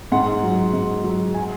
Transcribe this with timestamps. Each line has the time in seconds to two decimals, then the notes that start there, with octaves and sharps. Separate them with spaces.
0.12 G#2 F#5
0.43 F#3
0.73 G#2
1.04 F#3
1.34 G#5